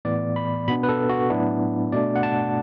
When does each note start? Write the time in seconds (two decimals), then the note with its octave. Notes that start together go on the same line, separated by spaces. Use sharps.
0.05 A2 E3 B3 D5
0.36 B5
0.68 B2 B3 D4 B5
0.83 B4
0.89 A4
1.09 F#4
1.30 A2 F#3 B3 D4 E4
1.92 B2 A3 D4 D5
2.16 F#5
2.23 A5